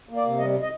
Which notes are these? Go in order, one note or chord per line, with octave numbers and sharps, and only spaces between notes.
A#3
D5
C3
G3 D#5
D#5